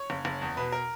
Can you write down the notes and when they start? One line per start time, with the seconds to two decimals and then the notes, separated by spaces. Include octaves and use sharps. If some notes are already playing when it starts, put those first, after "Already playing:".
Already playing: C#5
0.10 F#1
0.25 F#1
0.42 E2
0.57 B2 B4
0.72 A#4